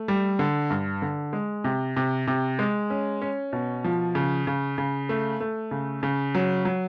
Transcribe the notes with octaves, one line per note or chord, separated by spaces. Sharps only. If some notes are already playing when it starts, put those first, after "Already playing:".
Already playing: A3
G3
D3
G2
D3
G#3
C3
C3
C3
G#3
C#4
C#4
B2
F3
C#3
C#3
C#3
A3
A3
C#3
C#3
F#3
F#3